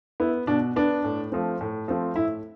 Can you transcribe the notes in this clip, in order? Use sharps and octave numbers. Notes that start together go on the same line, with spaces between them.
B3 E4
B2 D4
B3 D4
A2
F3 A3 C4
A2
F3 A3 C4
A2 E4